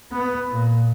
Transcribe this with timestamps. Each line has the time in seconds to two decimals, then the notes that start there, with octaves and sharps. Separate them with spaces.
0.12 B3
0.50 A#2